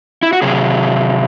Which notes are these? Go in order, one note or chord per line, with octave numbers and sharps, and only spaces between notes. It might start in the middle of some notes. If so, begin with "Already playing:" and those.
E4
F#4
C3 F#3 G#4